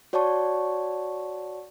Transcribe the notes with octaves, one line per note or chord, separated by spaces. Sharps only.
F#4 C#5 D5 F#5 A5 C#6